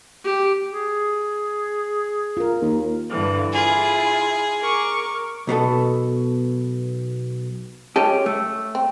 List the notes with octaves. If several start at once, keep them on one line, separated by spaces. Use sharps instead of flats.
G4
G#4
F4 A#4
D#2
G2 D3 E3
E4 F4 G#4
A#4 C#6 D6
B1 B2 B3 A4
F3 G#3 C#4 G4 A4
A3
C4